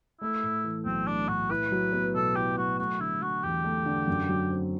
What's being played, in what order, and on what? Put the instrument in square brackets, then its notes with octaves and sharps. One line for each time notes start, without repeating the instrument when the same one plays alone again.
[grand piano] A3 [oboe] E4
[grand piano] A2
E3
[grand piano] B1 [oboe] C4
[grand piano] A3 [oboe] D4
[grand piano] A2 [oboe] F#4
[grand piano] E4 [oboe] B4
[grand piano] F#3
B3
[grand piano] B2 [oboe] A4
[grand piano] E4 [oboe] G4
[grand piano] F#3 [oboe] F#4
[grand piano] A3 [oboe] F#4
[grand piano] D3 [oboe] E4
[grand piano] F#3 [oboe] F#4
[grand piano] E2 [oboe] G4
[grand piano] A3
D3
F#2
F#3
C4